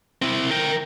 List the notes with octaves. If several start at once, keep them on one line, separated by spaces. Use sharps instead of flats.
C4 E4
A#4 G5